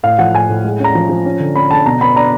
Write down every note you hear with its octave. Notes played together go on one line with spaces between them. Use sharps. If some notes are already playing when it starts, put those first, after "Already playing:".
A2 F5
F3 F#5
A2 G#5
A2
G#3
C#4 A#5
F3
F3
C#4
D3
C#4 B5
D3 A5
B2 A#5
B3 B5
D4 A#5